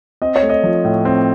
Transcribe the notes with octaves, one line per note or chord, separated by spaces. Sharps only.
C4 D#5
C#5
A3
D#5
F3
A2
C4